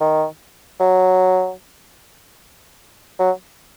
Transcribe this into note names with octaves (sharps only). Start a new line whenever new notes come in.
D#3
F#3
F#3